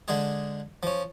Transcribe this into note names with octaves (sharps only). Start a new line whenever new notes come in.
D3 G#3 G#4
F3 C#4